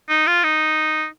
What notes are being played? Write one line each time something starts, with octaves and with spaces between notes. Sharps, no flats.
D#4
F4
D#4